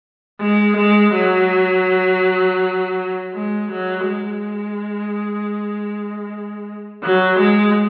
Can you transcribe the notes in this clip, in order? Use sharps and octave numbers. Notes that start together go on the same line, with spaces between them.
G#3
G#3
F#3
G#3
F#3
G#3
F#3
G#3